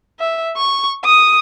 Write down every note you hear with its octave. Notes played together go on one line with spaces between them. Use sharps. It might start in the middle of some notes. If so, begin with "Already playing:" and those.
E5
C#6
D#6